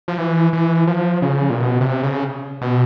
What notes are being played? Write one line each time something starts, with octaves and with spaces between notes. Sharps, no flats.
F3
E3
E3
F3
C#3
A#2
B2
C3
C#3
B2